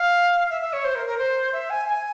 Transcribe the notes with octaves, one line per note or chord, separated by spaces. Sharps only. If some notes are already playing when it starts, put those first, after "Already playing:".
Already playing: F5
E5
E5
C#5
C5
A#4
A#4
C5
E5
G#5
G#5